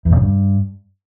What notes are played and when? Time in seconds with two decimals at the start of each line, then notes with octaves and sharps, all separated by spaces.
0.05 E2
0.10 A2
0.16 C#3
0.21 G2